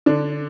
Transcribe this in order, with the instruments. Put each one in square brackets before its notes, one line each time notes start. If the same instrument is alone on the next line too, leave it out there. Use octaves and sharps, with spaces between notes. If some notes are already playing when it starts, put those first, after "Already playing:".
[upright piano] D3 D4